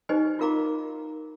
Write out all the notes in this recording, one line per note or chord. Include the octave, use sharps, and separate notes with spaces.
D#4 G4 B4 C5 D#5 G#5
F4 F#4 A#4 F5 A#5 D6